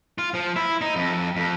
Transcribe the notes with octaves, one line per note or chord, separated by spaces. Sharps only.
F4
F3
E4
D#4
F2
F2